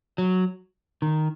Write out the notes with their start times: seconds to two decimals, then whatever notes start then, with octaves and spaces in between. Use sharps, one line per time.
0.18 F#3
1.02 D#3